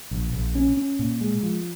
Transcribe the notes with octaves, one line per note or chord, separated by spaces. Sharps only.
A#1
A#1
C#4
C#4
A#2
G#3
F3